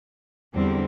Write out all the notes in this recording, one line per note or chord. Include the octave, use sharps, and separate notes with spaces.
E2 D3 G3 C4